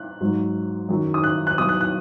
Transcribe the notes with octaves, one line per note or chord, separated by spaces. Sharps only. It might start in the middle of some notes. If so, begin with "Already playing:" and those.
Already playing: F#6
G#2 F#3
F#2 D#3 F#3
D#6
F#6
F#6
B2 F#3 D#6
F#6
F#6